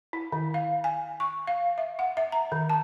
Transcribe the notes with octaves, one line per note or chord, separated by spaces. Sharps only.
E4
D#3
F5
G#5
C#6
F5
E5
F#5
E5
A#5
D#3
A5